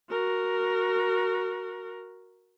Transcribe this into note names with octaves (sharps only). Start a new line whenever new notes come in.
F#4 A#4